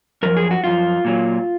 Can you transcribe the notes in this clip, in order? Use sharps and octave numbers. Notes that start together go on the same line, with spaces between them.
F#2 F3 A#4
G#4
F#4
F#2 F3 F4
A#2 F#3